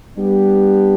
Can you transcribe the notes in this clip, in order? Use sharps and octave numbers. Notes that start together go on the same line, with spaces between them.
G3 B3 D4 G4